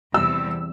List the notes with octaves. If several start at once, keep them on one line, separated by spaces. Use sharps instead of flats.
E2 C3 G3 E6